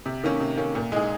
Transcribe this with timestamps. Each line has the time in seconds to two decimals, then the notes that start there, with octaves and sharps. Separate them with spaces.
0.06 C3
0.24 D#3 A#3 C#4
0.40 C3
0.57 D#3 A#3 C#4
0.75 A#2
0.92 G#3 D#4 G#4